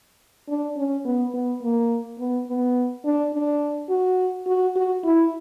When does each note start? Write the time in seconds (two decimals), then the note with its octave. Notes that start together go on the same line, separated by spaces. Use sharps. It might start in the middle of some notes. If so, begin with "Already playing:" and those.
0.48 D4
0.77 C#4
1.05 B3
1.33 B3
1.62 A#3
2.19 B3
2.47 B3
3.04 D4
3.33 D4
3.89 F#4
4.47 F#4
4.76 F#4
5.04 E4